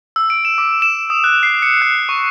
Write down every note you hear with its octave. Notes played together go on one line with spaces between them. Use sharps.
E6
D7
E7
D6
E7
D#6
F#6
C7
C#7
F#6
C#6